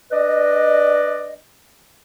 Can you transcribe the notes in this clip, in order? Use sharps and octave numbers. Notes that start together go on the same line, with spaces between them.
D4 B4 D5 D#5